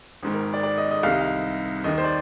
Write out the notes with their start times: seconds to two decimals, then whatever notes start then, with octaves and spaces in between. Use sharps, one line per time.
0.23 G#1 G#2 D#3
0.34 A#4
0.53 D5
0.63 D5
0.78 D#5
0.91 D#5
1.03 C2 C3 D#3 F5
1.12 D#5
1.21 F5
1.84 D#2 D#3 D#5
1.98 C5
2.04 D5